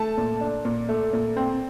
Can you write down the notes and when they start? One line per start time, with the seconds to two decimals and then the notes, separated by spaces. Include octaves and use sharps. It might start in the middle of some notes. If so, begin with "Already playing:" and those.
Already playing: A3 A5
0.17 A#2
0.41 D4
0.65 A#2
0.89 A3
1.13 A#2
1.36 C4